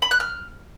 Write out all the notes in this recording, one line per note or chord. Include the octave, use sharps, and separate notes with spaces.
B5
F#6
F6